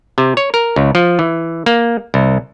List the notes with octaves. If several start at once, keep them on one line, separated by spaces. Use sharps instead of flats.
C3
C#5
A#4
C#2
F3
E3
A#3
C2